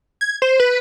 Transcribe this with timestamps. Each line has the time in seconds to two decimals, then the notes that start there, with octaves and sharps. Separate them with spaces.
0.21 G#6
0.42 C5
0.60 B4